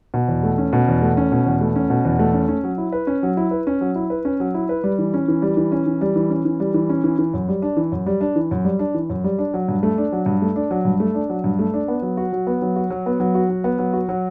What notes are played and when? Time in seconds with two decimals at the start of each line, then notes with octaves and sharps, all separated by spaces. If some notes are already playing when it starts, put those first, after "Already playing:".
0.14 B2
0.28 E2
0.43 A3
0.58 C#4
0.73 B2
0.88 E2
1.02 A3
1.17 C#4
1.32 B2
1.46 E2
1.61 A3
1.76 C#4
1.90 B2
2.05 E2
2.19 A3
2.34 C#4
2.48 C#4
2.64 F#3
2.78 E4
2.92 B4
3.07 C#4
3.23 F#3
3.37 E4
3.51 B4
3.67 C#4
3.81 F#3
3.95 E4
4.10 B4
4.25 C#4
4.40 F#3
4.54 E4
4.69 B4
4.84 G3
4.99 E3
5.14 C#4
5.28 E3
5.42 G3
5.57 E3
5.72 C#4
5.86 E3
6.01 G3
6.16 E3
6.30 C#4
6.45 E3
6.60 G3
6.74 E3
6.89 C#4
7.04 E3
7.19 E3
7.34 F#2
7.48 G3
7.62 D4
7.77 E3
7.92 F#2
8.06 G3
8.21 D4
8.36 E3
8.51 F#2
8.65 G3
8.79 D4
8.95 E3
9.10 F#2
9.24 G3
9.39 D4
9.54 F#3
9.69 G2
9.83 A3
9.98 D4
10.12 F#3
10.26 G2
10.42 A3
10.56 D4
10.71 F#3
10.85 G2
11.00 A3
11.15 D4
11.30 F#3
11.44 G2
11.59 A3
11.74 D4
11.88 B3
12.02 F#3
12.17 F#4
12.33 F#3
12.47 B3
12.62 F#3
12.76 F#4
12.90 F#3
13.06 B3
13.20 F#3
13.35 F#4
13.49 F#3
13.64 B3
13.79 F#3
13.93 F#4
14.09 F#3